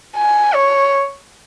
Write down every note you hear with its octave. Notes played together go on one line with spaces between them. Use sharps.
G#5
C#5